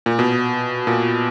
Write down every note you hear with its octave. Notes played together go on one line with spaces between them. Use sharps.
A#2
B2
A#2